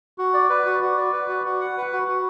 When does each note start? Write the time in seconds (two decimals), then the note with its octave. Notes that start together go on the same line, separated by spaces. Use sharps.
0.18 F#4
0.34 D5
0.49 B4
0.65 F#4
0.81 F#4
0.97 D5
1.13 B4
1.28 F#4
1.45 F#4
1.61 F#5
1.77 B4
1.92 F#4
2.08 F#4